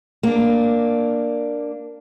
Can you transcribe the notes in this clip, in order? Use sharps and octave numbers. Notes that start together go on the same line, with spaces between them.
A#3 D4